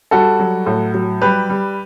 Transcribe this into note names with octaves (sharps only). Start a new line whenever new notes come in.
G3 F#4 A4
F#3
A2
F#3
G3 G4 B4
G3